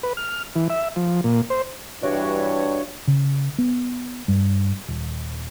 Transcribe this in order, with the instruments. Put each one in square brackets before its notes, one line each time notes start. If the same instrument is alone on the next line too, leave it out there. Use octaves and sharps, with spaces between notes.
[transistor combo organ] B4
F6
E3
E5
F3
A#2
C5
[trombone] G2 [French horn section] E3 G3 [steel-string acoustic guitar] D4 E4 F#4 [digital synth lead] C#5
[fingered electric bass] C#3
B3
G2
D#1